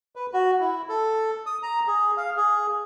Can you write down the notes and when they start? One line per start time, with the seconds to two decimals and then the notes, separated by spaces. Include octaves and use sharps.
0.16 B4
0.33 F#4
0.60 E4
0.89 A4
1.46 D#6
1.63 A#5
1.87 G#4
2.17 F5
2.37 G#4